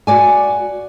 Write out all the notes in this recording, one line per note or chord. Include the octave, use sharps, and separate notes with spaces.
F#4 D5 G#5